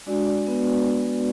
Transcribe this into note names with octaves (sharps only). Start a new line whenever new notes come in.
G#3 D4 F#4 D5
D4 D5
B3 B4